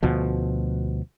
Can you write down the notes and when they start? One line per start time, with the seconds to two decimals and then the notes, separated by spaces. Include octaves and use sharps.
0.03 D2 B2 F3